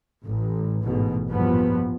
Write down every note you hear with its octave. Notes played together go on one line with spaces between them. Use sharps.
A1
A1 G#2 B2
E2 G2 A#2 F3 B3